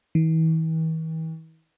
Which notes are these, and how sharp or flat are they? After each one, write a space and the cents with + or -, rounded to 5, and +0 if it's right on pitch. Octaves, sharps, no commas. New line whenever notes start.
E3 -45